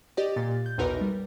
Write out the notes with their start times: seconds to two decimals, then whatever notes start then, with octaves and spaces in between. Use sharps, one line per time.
0.17 G4 D5 D#5
0.36 A#2 A6
0.66 G6
0.78 B1 E2 D#4 A#4 B4
1.01 G3